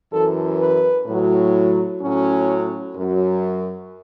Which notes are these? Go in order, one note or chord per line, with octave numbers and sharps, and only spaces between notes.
F#2 E3 A4
B4
A2 F#3
A2 F#3 C#4
F#2 F#3